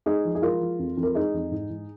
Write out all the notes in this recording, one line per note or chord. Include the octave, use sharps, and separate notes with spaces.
G#3 D#4 G#4
F3
G#4
G#3 F4 A#4
F3
F2
F2
A#4
G#3 D#4 G#4
F2
G#2
G#2